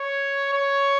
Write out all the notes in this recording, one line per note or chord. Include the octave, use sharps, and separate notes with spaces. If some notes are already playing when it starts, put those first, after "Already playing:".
Already playing: C#5
C#5